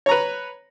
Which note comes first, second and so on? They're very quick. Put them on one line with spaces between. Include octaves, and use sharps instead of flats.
C#5 A#5 B4